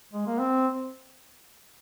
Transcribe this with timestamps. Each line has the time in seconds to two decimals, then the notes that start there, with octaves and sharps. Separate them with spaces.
0.13 G#3
0.27 A#3
0.39 C4